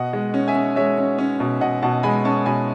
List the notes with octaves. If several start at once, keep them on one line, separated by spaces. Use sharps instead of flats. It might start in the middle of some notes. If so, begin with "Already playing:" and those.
Already playing: B2 D#5 F#5
G#3
C#4
E5 G#5
C#4
G#3 C#5 E5
C#4
C#4
B2
B2 D#5 F#5
B2 F#5 A5
G#3 G#5 B5
C#4 A5 C#6
B2 G#5 B5